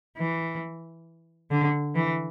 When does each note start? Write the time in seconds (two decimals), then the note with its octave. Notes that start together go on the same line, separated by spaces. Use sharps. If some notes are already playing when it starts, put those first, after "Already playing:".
0.17 E3
1.51 D3
1.95 E3